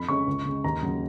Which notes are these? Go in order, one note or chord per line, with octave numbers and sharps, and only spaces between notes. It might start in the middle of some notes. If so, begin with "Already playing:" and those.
Already playing: F2 B5
C#3 G#3 C#4 C#6
C#2
C#3 G#3
D#2 A#5
C#3 F#3